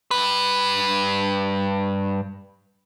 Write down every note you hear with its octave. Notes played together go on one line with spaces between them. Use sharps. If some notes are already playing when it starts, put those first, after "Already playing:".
G2 B4